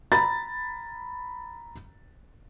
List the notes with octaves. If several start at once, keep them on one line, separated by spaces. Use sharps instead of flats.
A#5 B5 A6